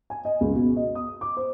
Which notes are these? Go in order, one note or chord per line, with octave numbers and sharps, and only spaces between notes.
G#5
D#5
C#2
B2
D#5
D#6
D6
C5